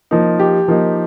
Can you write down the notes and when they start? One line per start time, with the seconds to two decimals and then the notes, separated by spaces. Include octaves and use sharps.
0.11 F3 A#3 D#4
0.39 G4
0.68 F3 A#3 D#4